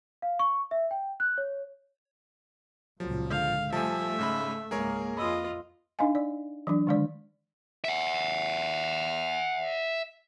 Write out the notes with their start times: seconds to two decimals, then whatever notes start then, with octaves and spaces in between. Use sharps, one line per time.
0.22 F5
0.39 C#6
0.71 E5
0.91 G5
1.20 F#6
1.38 C#5
3.00 C#2 A#2 F3 F#3
3.30 G#2 D3 F5 G6
3.72 F3 G3 A3 E5 G#5 A5
4.19 G#2 C#3 B5
4.71 C#2 G#2 A#3 G#4 A#4 C#5
5.17 F2 F4 D#5 B5 D#6 E6
5.99 D4 D#4 D#5 F5 G#5
6.15 D5
6.67 E3 F#3 D4
6.87 D3 D#3 G#3 D4 D5
7.84 E5 F#5